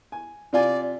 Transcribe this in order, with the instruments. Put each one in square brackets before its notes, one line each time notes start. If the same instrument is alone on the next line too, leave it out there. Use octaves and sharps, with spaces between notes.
[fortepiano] G#5
[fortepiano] C3 F4 G#5 [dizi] D5